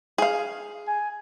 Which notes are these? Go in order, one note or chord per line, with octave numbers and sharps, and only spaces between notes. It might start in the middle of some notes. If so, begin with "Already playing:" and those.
G#4 F5
G#5